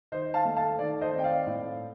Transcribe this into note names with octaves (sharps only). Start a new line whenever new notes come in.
D#3 C5 D#5
F5 A5
A3
F5 A5
D#3 D5
C5 D#5
C4
G5
D5 F5
A2